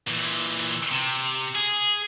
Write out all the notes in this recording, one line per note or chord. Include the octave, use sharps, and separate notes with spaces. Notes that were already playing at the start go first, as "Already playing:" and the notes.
A#2 E3
C3
G#4